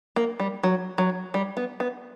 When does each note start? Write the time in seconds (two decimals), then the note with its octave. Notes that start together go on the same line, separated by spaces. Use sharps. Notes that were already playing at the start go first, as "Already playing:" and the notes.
0.16 A#3
0.40 G3
0.63 F#3
0.98 F#3
1.34 G3
1.57 B3
1.80 B3